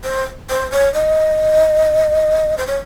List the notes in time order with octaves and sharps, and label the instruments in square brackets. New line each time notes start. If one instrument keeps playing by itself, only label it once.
[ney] C5
C5
C#5
D#5
C5
C#5